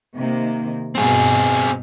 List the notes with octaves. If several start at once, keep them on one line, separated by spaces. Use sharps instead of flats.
C3 D#3 A#3
G2 B2 C4 G#4